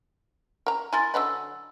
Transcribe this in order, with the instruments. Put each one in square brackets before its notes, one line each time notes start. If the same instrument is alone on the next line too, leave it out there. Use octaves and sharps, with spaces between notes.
[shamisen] A#4 A#5
[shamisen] E4 A#4 [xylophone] G#5 C6 A6
[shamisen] D3 F#3 B4 [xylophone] D#5 E6